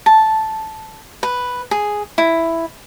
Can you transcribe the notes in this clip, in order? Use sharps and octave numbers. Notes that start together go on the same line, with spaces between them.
A5
B4
G#4
E4